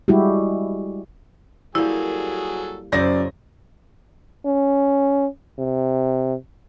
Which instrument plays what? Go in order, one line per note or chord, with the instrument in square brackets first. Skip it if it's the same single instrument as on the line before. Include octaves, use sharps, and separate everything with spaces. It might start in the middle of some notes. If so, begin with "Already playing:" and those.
[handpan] G3 G#3 E4 F#4 G4
[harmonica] F#3 G#4 A4 [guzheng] G3 A#3 [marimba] E4
[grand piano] F#2 D5 A#6 [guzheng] C#3 E4 C5
[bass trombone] C#4
C3